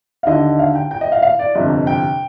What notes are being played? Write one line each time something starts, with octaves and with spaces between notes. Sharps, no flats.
F5
D#2 D3 D#5
F5
G5
G5
D#5
F5
F5
D5
G1 F2 C3 D#5
G5